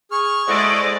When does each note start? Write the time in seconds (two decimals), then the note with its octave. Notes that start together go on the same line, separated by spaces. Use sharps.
0.11 G#4 C#6 F6
0.48 G#3 E4 A4 C5 D5 D#5 F#5